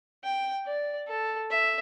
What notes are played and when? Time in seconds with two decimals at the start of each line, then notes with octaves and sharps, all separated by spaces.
0.24 G5
0.66 D5
1.08 A4
1.50 E5